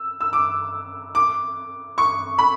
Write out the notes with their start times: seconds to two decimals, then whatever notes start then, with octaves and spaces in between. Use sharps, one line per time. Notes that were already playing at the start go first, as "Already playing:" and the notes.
Already playing: E6
0.21 E6
0.33 D6
1.15 D6
1.98 C#6
2.38 B5